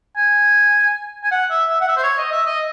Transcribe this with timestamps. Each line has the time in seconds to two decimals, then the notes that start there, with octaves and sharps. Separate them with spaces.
0.17 G#5
1.23 G#5
1.31 F#5
1.50 E5
1.70 E5
1.81 F#5
1.88 E5
1.97 C5
2.03 C#5
2.18 D#5
2.32 E5
2.46 D#5